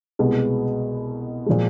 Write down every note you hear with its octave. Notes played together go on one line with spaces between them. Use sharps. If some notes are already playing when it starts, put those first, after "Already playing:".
C2 B2 G#3 B3
A#2 F3 G#3